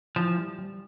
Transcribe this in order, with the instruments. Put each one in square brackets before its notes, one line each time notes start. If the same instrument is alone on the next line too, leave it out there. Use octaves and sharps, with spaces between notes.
[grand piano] E3 [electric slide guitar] F3
[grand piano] G3
G3